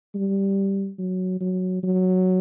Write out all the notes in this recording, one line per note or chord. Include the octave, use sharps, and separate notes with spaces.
G3
F#3
F#3
F#3